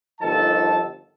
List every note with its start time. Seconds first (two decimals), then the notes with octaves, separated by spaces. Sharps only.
0.21 G1 D#3 F3 A4 A5